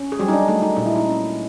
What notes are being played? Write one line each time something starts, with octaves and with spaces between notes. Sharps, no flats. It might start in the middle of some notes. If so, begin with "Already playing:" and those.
Already playing: C#4
G#4
F#3 G3 G4
D#4
D4
A3 D#4
D#4
A#2 D#4
E4
D#4
C#4